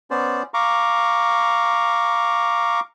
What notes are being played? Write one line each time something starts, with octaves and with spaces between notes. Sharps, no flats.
B3 C#4 C5 D5
F5 A#5 C#6 D6